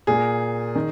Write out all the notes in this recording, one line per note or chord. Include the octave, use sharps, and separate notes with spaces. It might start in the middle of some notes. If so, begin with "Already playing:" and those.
A#2 A#3 G#4
D#3